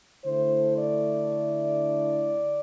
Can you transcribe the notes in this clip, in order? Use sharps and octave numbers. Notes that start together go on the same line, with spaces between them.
D3 A3 E4 C5
D5